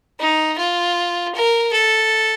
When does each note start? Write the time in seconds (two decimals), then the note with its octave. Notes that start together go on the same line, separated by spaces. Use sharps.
0.20 D#4
0.58 F4
1.35 A#4
1.73 A4